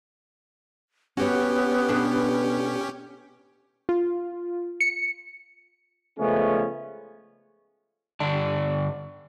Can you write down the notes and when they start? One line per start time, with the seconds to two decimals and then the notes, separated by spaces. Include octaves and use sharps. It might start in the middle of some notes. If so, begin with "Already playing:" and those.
1.17 B3 C#4 F#4 G4 C#5
1.89 B2 D4 A4
3.89 F4
4.80 C#7
6.19 C#3 F3 G#3 A3 B3 C#4
8.20 G2 D3 D5 A5